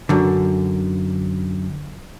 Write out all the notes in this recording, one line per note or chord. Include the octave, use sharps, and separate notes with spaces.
F#2 D3